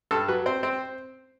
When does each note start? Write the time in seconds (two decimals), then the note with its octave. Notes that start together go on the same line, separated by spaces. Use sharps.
0.11 G2 A4
0.28 F#3 B4
0.46 C4 C5
0.63 C4